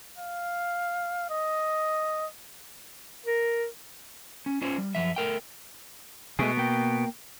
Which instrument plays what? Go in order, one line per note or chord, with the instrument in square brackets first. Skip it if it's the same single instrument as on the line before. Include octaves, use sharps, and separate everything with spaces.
[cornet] F5
D#5
[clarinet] A#4
[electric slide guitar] C#4
C#4 F4 C5 C#5
G3
F#2 F3 E5
A3 A#4 G5
[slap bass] B2 [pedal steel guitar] G#3 A3 G#4
[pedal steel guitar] A#3 G5